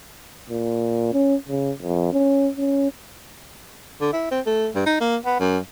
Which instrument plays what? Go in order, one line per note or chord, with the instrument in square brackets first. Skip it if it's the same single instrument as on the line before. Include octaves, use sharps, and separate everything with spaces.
[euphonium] A#2
C#4
C#3
F2
C#4
C#4
[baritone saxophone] D3
E4
C4
A3
G2
D#4
A#3
B3
F#2